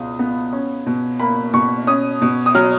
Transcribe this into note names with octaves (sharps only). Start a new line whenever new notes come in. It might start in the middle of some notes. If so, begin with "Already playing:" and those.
Already playing: C#2 B2 D#6
B3
C#4
B2
A#3 B5
B2 C#6
C#4 D#6
B2
D#6
F#3 F6